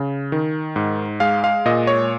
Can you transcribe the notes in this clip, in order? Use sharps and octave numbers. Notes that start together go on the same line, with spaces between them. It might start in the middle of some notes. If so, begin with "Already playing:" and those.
Already playing: C#3
D#3
G#2
G#3 F5
F5
A#2 D#5
C#5